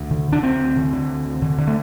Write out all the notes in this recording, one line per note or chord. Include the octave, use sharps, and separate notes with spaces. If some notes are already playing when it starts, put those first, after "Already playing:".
Already playing: D2 D4
D3
D3 D4
D2 C4
D2
D3
D3
D2
D2
D3
D3
A3